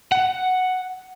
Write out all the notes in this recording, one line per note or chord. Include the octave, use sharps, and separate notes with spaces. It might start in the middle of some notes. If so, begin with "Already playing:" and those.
F#5